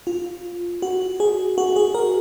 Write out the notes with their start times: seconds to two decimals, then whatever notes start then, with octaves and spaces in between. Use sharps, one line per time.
0.07 F4
0.82 F#4
1.20 G#4
1.58 F#4
1.76 G#4
1.95 A#4